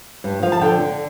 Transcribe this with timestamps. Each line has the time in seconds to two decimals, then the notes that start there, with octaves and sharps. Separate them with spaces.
0.24 G2
0.42 F3 F5
0.52 A5
0.61 D3 G5
0.80 D3